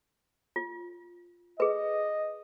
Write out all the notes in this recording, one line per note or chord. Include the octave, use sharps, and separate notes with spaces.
F4
G#4 B4 D#5